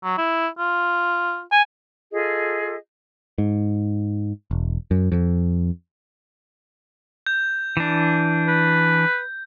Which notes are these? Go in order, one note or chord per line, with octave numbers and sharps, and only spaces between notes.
F#3
E4
F4
G#5
F4 G#4 A4 D#5
G#2
E1
F#2
F2
G6
E3 D4
B4